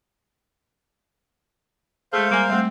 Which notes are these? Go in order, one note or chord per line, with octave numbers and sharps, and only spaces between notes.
G#3 A3 G#4 C5 F5
G3 A#3 G#5
G3 A3 C4